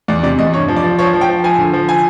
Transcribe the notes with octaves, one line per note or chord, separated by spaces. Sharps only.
E2 D5
C3 D5
E2 D#5
G2 C#5
F3
D5
F3
F3 C#5
F3
G5
F3
F3 G#5
D3
F3
G#5